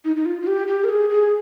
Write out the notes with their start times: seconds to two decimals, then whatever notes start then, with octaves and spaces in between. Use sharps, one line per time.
0.05 D#4
0.16 D#4
0.26 F4
0.41 F4
0.47 G4
0.68 G4
0.84 A#4
0.89 G#4
1.10 G#4